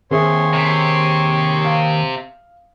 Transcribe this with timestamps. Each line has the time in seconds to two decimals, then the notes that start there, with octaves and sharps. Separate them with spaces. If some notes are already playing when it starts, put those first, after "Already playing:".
0.11 D#2 C4 G#4 C#5 E5 C6
0.53 C3
1.65 F5